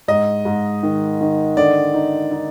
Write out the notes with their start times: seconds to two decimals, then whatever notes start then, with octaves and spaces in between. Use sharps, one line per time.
0.08 G#2 D#5
0.45 G#2
0.83 D#3
1.20 D#3
1.57 D3 D5
1.94 D#4
2.31 D#4